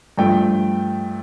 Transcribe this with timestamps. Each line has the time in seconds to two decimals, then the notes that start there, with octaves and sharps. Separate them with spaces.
0.18 G2 F3 A3 G5